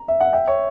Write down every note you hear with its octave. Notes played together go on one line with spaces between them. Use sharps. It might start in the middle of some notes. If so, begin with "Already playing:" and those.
Already playing: A#5
E5
F#5
E5 G5
C#5 E5